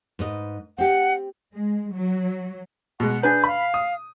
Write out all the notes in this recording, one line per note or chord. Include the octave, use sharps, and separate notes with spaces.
G#2 B4 D#5
C4 G4 F#5
G#3
F#3
B2 G#3 F#5
D4 G#4 B4 G6
F5 B5
D#6